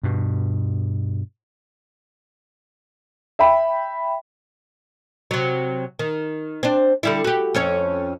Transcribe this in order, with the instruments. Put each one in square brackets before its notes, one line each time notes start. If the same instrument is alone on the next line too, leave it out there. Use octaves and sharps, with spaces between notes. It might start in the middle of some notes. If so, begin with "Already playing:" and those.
[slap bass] G2 B2
[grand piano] E5 G5 B5
[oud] C3 F#3
D#3
C4 D4
D3 G3 E4
F#4 G4
F2 C#4 C#5